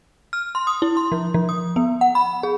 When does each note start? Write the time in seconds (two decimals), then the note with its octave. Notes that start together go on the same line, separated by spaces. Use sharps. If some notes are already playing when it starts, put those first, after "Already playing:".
0.33 F6
0.55 C6
0.67 D#6
0.82 E4
0.97 C6
1.12 F3
1.34 F3
1.49 D#6
1.76 B3
2.01 F#5
2.15 B5
2.43 G#4